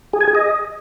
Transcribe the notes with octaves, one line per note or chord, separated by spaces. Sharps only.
G#4
G#5
G#4
D#5